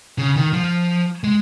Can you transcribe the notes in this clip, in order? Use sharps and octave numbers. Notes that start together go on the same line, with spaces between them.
C#3
D#3
F3
G#3